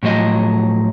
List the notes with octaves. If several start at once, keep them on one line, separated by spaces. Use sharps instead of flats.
A2 F3 F#3 D#5